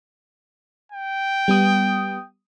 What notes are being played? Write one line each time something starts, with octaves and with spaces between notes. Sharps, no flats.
G5
G3 B3 D#6